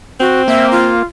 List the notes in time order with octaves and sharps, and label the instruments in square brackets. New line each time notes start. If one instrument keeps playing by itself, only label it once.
[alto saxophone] C4 [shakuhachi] F#4
[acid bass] A#3 [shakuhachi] E5
[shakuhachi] F4